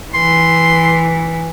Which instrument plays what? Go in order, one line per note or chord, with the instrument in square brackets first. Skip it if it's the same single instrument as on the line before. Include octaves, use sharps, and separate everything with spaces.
[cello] E3 [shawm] C6